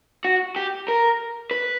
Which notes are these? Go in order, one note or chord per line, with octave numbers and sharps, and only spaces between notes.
F#4
G4
A#4
B4